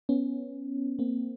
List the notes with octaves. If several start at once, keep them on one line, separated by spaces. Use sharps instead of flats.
B3 C#4
A#3 C4